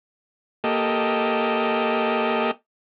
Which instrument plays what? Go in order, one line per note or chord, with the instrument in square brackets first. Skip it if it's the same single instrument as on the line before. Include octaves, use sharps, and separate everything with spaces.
[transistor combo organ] A#3 G4 A4 D#5